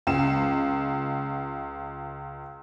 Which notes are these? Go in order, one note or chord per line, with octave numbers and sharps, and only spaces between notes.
C#2 E7